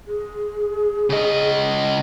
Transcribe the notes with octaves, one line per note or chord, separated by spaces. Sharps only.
G#4
C#3 D#5